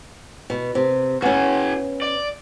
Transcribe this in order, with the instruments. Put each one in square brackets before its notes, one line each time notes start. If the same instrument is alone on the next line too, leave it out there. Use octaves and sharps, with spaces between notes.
[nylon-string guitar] B2
C3
[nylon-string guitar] B3 C#4 [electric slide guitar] F#4 G#4
[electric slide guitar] D5